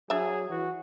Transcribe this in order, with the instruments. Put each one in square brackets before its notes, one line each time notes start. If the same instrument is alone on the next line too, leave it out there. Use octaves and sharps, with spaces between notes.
[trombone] F#3 [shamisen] D4 E5 [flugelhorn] G#4
[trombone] E3 [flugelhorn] F#4